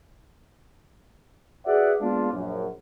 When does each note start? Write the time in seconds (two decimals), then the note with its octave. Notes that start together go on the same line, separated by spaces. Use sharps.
1.66 F#4 G#4 B4 D5 E5 F#5
2.01 G#3 A#3 B3 D4 F4
2.32 A#1 F#2